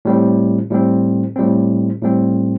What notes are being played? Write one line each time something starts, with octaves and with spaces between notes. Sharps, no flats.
A2 G3 C4
A2 G3 C4
A2 G3 C4
A2 G3 C4